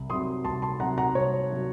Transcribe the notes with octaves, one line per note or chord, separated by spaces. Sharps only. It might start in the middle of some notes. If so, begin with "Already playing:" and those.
Already playing: C2
C3 F#3 C6 D#6
C2 A5 C6
A5 C6
C3 F#3 F#5 A#5
F#5 A#5
C2 C#5
C3 F#3